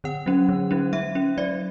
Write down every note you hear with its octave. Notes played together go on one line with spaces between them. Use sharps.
D3 F#5
F#3 C#4
D3
F#3 C#4
F#3 E5
C#4
F#3 D5